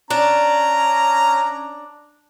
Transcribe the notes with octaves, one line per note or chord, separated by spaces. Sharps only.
C#4 D4 A#5